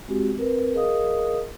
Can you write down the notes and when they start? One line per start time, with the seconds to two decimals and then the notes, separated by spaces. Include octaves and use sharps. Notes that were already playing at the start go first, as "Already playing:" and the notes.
0.08 G#3 C4 F#4 G4
0.37 C4 A#4 B4
0.74 G#4 A#4 D#5 F5 D#6